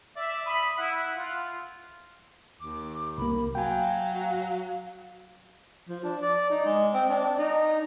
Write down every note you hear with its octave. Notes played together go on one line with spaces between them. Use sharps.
D5 E5
B5 D#6
E4 F#5
F4
D#2 D6
C2 A#3 B5
F#3 F5 G5 G#5
F3
D4
D5
D#4
G#3
C4
D4
D#4